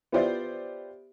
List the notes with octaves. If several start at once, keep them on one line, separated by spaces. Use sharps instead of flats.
B3 F4 G4 C5 D5 E5